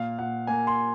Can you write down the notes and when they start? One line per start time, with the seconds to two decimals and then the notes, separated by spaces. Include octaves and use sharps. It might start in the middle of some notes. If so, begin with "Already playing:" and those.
Already playing: A#2 F5
0.19 A#2 F#5
0.47 A#3 G#5
0.67 C6